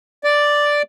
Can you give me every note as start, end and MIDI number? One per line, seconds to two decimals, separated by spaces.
0.24 0.82 74